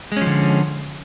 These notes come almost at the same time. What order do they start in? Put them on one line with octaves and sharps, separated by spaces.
G#3 C#4 F3 D3